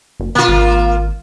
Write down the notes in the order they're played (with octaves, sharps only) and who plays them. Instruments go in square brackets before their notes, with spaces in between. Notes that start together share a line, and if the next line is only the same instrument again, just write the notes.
[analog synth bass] F#1
[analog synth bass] B2 [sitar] A#3 F4
[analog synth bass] G#1